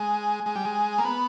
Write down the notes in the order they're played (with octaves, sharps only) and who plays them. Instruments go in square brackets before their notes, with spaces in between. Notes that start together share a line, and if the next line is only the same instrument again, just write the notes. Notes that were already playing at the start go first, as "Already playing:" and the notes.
Already playing: [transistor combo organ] G#3
G#3
G3
G#3
A#3
B3